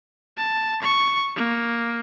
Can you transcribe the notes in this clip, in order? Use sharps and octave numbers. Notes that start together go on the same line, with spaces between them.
A5
C#6
A#3